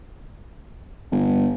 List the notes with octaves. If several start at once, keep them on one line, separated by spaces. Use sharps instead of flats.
G1